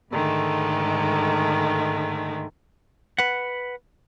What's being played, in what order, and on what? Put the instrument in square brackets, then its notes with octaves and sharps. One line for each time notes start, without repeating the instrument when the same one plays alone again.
[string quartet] G#2 D3 D#3 G#3 A3
[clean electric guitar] B4 F#5